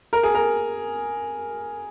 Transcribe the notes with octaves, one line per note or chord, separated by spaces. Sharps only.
A#4
G#4
A#4